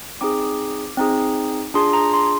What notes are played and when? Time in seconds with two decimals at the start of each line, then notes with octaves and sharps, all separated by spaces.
0.21 C4 D#4 G#4 D6
0.97 C4 D#4 G#4
1.74 D4 F4 G#4 C6
1.93 A#5
2.13 C6